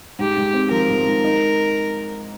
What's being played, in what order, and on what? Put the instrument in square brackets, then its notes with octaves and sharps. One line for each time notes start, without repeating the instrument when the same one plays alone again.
[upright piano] G#2 [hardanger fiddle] G4
[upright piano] G#2
C4
[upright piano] F3 [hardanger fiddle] A#4
[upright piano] G#2
G#2
D#4